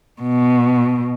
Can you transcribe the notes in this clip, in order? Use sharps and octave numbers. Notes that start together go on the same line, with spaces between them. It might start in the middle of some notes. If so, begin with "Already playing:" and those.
B2